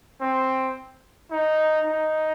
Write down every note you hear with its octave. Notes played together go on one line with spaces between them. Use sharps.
C4
D#4
D#4